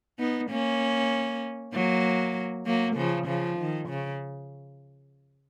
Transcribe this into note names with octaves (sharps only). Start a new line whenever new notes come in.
B3 D#4
A#3 C#4
F#3 A#3
F#3 A#3
C#3 F3
C#3 F3
D#3
C#3